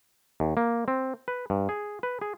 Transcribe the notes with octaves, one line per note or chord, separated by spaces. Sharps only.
D#2
A#3
C4
B4
G2
G#4
B4
G#4